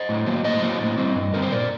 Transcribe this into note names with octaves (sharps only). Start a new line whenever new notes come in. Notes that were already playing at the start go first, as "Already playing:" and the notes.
Already playing: C5 D#5
A2
F#3 A#3
A2 C5 D#5
F#3 A#3
A2
G3 C4
G2
D3 G3 C4 A#4
C5
A#2 A#4 D5